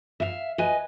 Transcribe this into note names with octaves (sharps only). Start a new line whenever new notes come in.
E5 F5
B4 D#5 G#5